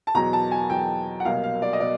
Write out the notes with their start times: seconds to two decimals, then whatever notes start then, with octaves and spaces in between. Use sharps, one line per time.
0.07 A5
0.14 E2 B2 F#3 A#5
0.33 A5
0.51 G#5
0.70 E2 B2 F#3 G5
1.20 F#5
1.25 C2 B2 F#3 A#3 F5
1.44 F5
1.62 D5
1.73 D#5
1.80 B2 D5